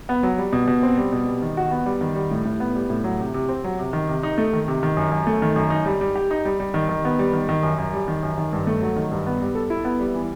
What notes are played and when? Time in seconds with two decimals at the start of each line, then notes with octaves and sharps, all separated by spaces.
0.09 B3
0.23 F#3
0.38 G3
0.53 B2
0.67 B2
0.83 C4
0.98 G3
1.12 B2
1.27 G3
1.42 D#3
1.57 F#4
1.71 B3
1.86 G3
2.01 D#3
2.15 G3
2.31 A2
2.45 A2
2.60 B3
2.75 G3
2.90 A2
3.04 F#3
3.20 C3
3.34 C3
3.49 C4
3.64 F#3
3.79 C3
3.93 D#3
4.09 C3
4.23 D#4
4.38 A3
4.53 D#3
4.68 C3
4.83 D#3
4.97 F#2
5.12 F#2
5.27 A3
5.42 D#3
5.56 F#2
5.70 D#4
5.86 G3
6.01 G3
6.15 G4
6.31 D#4
6.45 G3
6.60 G3
6.74 D#3
6.89 D#3
7.05 B3
7.19 G3
7.33 D#3
7.49 D#3
7.63 F#2
7.78 F#2
7.93 G3
8.08 D#3
8.23 F#2
8.38 D#3
8.53 G2
8.67 A3
8.82 F#3
8.96 D#3
9.12 G2
9.26 B3
9.42 G3
9.55 A4
9.70 E4
9.85 B3
10.00 G3
10.14 E3